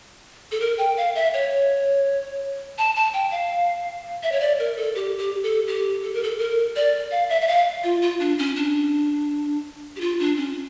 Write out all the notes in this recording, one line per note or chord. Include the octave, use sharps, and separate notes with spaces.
A4
A#4
G5
F5
E5
C#5
A5
A5
G5
F5
E5
C#5
D5
A#4
A4
G4
G4
A4
G4
A4
A#4
A4
A#4
D5
F5
E5
E5
F5
F4
F4
D4
C#4
D4
G4
F4
D4
C#4